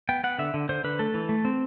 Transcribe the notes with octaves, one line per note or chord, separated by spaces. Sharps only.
B3 G5
B3 F#5
D3 E5
D3
D3 C5
D3 B4
A3 A4
E3
A3
C4